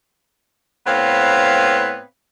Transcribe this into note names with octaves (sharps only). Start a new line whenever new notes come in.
A2 B3 C4 B4 C#5 F5